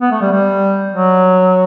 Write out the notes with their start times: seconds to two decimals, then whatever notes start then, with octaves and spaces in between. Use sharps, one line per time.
0.01 B3
0.11 A3
0.21 G3
0.32 G3
0.92 F#3